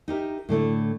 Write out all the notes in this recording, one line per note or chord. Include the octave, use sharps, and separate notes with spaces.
D#4 G4 A#4 E5
A2 D3 A3 E4